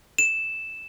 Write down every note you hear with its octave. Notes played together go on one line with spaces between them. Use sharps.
E7